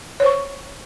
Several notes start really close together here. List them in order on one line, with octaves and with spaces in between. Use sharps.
C#5 C5 C#6